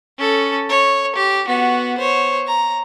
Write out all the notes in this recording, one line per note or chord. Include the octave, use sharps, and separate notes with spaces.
C#4 A4
C#5
G4
B3 F#4
C5 C#5
A#5